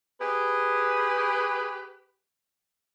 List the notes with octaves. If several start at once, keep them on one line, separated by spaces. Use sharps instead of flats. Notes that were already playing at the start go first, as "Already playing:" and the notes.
G4 G#4 B4